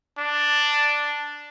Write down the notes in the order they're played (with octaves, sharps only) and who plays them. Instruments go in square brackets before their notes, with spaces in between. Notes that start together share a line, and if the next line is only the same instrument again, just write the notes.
[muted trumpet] D4